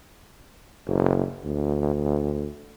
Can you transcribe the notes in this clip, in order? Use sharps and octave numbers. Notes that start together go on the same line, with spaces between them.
F#1
D2